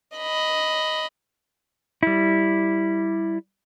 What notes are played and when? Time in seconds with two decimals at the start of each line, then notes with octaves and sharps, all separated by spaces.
0.17 D#5 B5
2.03 G3 E4